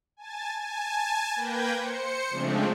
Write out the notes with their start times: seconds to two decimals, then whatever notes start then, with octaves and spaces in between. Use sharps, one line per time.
0.17 G#5 A5 A6
0.59 G#5 A5
1.36 A#3 B4 G5 G6 G#6 A#6
1.75 C5 C#7
2.30 C#3 F3 G#3 A3 C4 D4